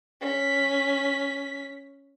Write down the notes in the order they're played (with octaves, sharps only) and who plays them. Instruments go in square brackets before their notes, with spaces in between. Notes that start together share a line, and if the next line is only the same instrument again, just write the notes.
[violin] C#4 B6